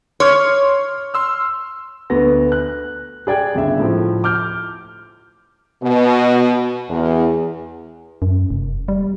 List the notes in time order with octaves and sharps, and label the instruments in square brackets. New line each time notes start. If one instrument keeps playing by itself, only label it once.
[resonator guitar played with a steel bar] C#5 [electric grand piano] C6 D6 F6
[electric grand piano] C6 E6 F6
[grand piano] D2 B3 B4 A#6
F#6
G#4 D5 G5 G#6
G1 C#3 E5
A2 F3
D6 F6 G6
[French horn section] B2
E2
[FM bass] F#2
F1
G3